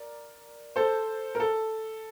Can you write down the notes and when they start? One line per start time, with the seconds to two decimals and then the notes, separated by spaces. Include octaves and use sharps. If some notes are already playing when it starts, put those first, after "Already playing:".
Already playing: A#4 D5
0.76 A4 C5
1.35 A#4
1.40 A4